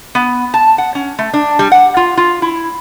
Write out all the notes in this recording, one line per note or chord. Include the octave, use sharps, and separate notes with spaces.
B3
A5
F#5
C#4
A3
D4
G3
F#5
F4
F4
E4